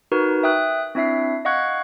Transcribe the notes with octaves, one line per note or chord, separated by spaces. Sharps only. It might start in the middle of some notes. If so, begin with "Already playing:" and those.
D#4 F#4 A#4 B4
E5 G5 D#6 F#6
C4 D4 E4 E5 C7
D#5 F5 F#5 C#6 F#6 G#6